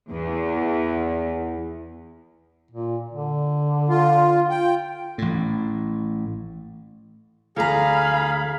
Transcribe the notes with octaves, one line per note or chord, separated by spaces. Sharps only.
E2
A#2
D3
F4
F4 G5
A1 A2
D2 G#4 F5 A#5 B5